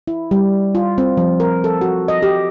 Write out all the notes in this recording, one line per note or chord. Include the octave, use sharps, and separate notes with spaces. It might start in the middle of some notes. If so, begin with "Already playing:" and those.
E4
G3
F4
C4
F3
A#4
A4
F#4
D#5
G4